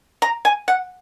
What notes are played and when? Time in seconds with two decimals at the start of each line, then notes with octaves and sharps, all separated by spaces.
0.22 A#5
0.45 G#5
0.68 F#5